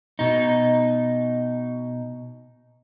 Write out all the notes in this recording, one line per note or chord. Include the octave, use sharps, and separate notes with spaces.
B2 D#4